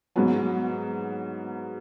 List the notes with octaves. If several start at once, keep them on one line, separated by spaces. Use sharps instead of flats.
G#2 F#3 B3